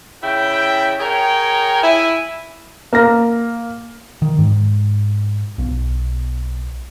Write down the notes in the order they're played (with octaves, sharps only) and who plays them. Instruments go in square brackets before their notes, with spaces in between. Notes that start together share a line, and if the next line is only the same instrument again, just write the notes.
[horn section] C#3 E4 G5
G#4 A#4 C#5 G5
E4 G#5
[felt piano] A#3 F6 A#6
[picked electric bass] D#3
G#2
B1